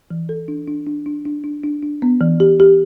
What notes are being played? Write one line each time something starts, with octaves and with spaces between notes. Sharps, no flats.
E3
A4
D4
D4
D4
D4
D4
D4
D4
D4
B3
E3
G4
G4